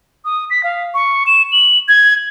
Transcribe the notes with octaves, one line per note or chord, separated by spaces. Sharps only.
D#6
B6
F5
C#6
E7
F#7
G#6